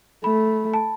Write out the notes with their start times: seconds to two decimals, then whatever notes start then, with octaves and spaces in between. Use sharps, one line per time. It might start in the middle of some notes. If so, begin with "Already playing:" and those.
0.24 A3 B5
0.74 A5